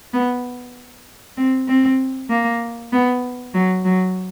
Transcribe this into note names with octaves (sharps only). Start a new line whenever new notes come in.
B3
C4
C4
A#3
B3
F#3
F#3